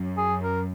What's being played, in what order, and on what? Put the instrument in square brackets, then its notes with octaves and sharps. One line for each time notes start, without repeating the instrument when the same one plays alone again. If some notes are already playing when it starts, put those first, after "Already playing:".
Already playing: [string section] F#2
[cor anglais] G#4
A#4